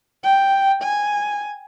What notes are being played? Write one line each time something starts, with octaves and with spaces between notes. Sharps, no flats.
G5
G#5